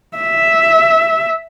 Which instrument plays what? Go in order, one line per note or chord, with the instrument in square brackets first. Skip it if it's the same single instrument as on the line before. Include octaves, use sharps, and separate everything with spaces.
[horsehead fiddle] E5